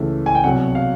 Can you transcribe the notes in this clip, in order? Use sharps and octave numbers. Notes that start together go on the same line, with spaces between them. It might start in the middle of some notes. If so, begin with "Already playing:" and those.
Already playing: C#2 C#3 E3 A3
G#5
G5
C2 B2 F#3 F#5
F5